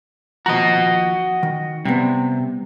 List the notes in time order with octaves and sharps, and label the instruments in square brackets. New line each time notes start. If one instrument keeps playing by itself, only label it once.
[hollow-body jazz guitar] D#2 F3 A#5 [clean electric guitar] F#4 D#5
[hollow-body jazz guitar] D#3
[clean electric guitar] C3 [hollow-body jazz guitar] G3 B3